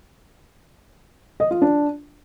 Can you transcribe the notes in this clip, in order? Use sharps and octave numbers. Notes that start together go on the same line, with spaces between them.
D#5
F4
D4